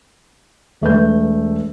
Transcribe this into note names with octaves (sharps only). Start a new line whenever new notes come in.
E1 A3 B4 G6